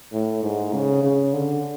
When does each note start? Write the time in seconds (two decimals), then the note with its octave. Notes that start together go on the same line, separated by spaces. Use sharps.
0.13 A2
0.43 G#2
0.73 C#3
1.03 C#3
1.34 D3